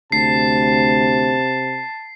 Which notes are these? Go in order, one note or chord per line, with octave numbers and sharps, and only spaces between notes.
D2 C3 A5 C7